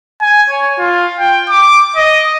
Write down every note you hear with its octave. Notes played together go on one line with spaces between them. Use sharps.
G#5
C#5
F4
G5
D6
D#5